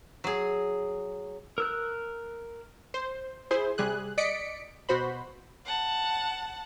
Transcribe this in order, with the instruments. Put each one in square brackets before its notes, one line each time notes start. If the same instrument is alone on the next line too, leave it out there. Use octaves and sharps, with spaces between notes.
[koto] F#3 G#4
[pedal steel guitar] A#4 E6 F#6
[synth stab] C5
E4 G#4 C5
C3 G3 G#4 F#6
D5 D#5 B6 C#7 D7
B2 F#4 C5 B5
[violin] F#5 A5